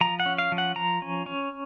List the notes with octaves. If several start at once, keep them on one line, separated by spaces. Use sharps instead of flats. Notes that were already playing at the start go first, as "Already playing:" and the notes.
F3 A#5
F#5
C#4
F5
F3
F#5
F3 A#5
C#4
C#4